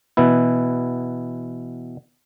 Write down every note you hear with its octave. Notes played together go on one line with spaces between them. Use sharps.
B2 E3 B3 E4